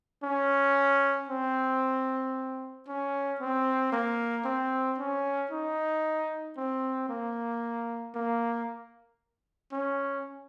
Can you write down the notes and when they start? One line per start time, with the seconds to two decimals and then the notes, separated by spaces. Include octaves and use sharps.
0.23 C#4
1.29 C4
2.88 C#4
3.40 C4
3.92 A#3
4.45 C4
4.98 C#4
5.51 D#4
6.57 C4
7.09 A#3
8.15 A#3
9.72 C#4